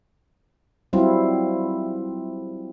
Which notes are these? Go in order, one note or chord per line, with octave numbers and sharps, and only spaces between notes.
F#3 G3 C4 E4 F4